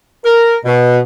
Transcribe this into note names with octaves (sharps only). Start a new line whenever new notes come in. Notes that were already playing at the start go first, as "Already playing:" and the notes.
A#4
B2